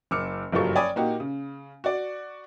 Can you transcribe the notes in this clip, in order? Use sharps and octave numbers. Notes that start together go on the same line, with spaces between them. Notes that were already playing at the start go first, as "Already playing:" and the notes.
F#1 D6 E6 F6 C#7
F#1 G2 F3 F#3 A4 C#6
C#5 D5 G5 G#5 B5 D#6
A#2 A#3 D#4 F#4 G4
C#3
F#4 D5